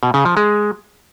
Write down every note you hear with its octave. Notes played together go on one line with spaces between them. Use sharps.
B2
C#3
F3
G#3